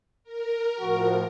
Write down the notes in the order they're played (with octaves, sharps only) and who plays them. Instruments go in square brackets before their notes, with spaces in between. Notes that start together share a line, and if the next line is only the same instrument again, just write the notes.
[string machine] A#4
[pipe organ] A2 F3 [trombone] F#4